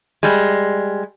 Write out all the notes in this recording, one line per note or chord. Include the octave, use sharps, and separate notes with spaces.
G3 G#3